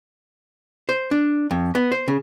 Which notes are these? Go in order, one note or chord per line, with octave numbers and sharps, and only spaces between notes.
C5
D4
F2
B3
C5
C#3